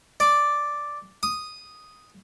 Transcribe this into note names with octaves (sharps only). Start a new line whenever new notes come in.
D5
D#6